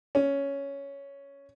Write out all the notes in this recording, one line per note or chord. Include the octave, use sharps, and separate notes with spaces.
C#4